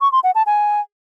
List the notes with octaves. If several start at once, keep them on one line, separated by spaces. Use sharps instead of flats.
C#6
C6
F#5
A5
G#5